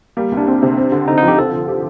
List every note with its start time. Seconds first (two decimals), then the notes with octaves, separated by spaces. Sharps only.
0.17 G3 A#3
0.32 C2
0.37 D4
0.47 C4
0.62 C3
0.77 C4
0.92 D3
1.07 D3 D#4
1.17 D#4
1.23 F3
1.28 G4
1.38 C4 A4
1.53 D3
1.68 G4